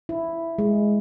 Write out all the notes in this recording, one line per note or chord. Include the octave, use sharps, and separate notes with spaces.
E4
G#3